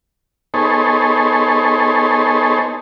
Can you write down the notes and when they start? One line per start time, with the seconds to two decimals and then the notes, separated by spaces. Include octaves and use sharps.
0.54 B3 D#4 G#4 A4 C5 C#5